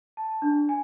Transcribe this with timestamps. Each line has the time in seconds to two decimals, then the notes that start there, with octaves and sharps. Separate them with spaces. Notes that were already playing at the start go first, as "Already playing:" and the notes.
0.17 A5
0.42 D4
0.69 G#5